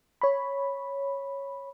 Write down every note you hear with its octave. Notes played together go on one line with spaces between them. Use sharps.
C#5 B5